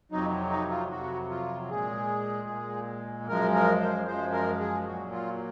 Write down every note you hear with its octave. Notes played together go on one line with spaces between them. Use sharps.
F2 C3 F#3 D#4
D#4
F4
F2 C3 F#3 F#4
F4
A#2 G#3 G#4
A#2 G#3
F#2 F3 G#3 A#4
A#4
C5
F#2 F3 G#3 C5
A#4
G#4
A#2 F#3 F#4
F4